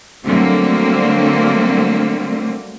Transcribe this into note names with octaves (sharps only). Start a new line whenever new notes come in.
D3 F#3 G3 A3 A#3 C4